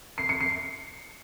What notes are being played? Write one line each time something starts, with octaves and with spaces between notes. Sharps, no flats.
C7
C#7
C7